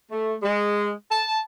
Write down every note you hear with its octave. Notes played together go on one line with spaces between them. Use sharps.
A3
G#3
A5